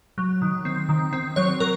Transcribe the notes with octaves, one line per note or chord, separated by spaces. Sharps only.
F#3
D#3
C4
D#3
C4
F#3 C#5
F#3 A#4